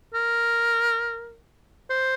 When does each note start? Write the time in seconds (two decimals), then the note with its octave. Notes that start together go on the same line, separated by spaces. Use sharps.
0.14 A#4
1.90 C5